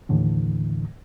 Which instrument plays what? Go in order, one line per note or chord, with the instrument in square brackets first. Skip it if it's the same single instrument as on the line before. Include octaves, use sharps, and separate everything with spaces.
[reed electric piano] D#2 A2 D3 E3